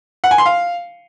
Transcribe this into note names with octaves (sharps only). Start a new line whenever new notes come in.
F#5
G#5
C6
F5